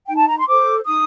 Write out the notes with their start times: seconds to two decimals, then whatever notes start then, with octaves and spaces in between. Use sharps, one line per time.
0.07 D#4 G5
0.17 A5
0.28 A#5
0.38 C6
0.48 A4 C5 D6
0.86 D#4 D#6